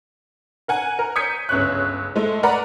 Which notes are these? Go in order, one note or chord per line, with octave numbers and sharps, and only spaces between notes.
A#4 F#5 G#5
A#4
D#6 G6 G#6 B6 C#7 D#7
G1 C#2 C#5 F#6
G#3 A3
A#4 B4 D5 F#5 A#5 B5